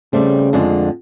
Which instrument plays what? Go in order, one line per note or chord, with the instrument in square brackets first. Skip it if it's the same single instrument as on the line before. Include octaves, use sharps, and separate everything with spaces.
[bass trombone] C#3 [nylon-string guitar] G3 A3 C4
[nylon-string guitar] F2 D3 G#3